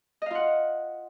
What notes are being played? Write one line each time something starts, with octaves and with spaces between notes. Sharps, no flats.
F4 D#5 F5 F#5